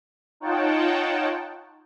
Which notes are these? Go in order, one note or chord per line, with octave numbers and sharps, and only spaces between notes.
D#4 F4 C#5 F#5 G5 A5